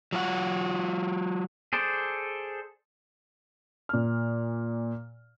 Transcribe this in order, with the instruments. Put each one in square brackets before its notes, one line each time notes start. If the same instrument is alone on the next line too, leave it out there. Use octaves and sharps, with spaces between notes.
[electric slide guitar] F#3 F4 F#5
[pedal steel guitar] G#4 A4 C5 D5
[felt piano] A#2 F6